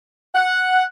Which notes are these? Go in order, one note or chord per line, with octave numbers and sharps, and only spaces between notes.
F#5